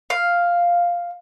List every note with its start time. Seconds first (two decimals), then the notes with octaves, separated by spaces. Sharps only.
0.10 F5